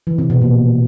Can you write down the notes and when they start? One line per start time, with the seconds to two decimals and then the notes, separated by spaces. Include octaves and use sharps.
0.07 E3
0.18 C3
0.30 B2
0.41 A#2